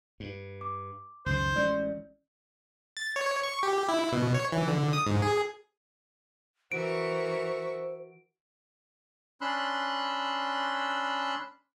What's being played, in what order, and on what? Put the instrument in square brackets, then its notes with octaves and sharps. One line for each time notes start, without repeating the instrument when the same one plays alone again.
[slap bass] G2
[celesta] D6
[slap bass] C#2 F#2 D#3 [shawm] C5
[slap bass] A1 G#3 C#4 [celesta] D5 G6
[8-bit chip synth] A6
C#5
C#6
G4
E4
B2
C#5
E3
D3
D#6
G#2
G#4
[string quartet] E3 A#4 C#6 [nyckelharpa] F#4 E5 [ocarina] C5 [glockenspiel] D7
[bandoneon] C#4 D4 B5 C6 E6 F#6